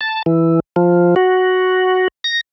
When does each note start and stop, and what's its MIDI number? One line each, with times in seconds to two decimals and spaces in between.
0.01 0.22 81
0.26 0.60 52
0.76 1.15 53
1.16 2.08 66
2.24 2.41 94